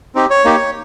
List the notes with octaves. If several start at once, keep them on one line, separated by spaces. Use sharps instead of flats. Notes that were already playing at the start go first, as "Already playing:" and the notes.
C4 D#4 G4
C#5
A#3 D#4 G4